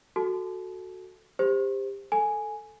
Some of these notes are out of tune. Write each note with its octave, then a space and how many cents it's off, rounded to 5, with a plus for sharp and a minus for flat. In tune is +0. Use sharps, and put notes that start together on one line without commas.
F#4 +0 A4 +0 A5 -35
G4 +25 C5 +0
A4 +0 G#5 +0